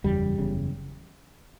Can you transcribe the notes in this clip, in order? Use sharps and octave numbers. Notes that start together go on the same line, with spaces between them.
F#1 E2 C#3 G3
F#1 E2 C#3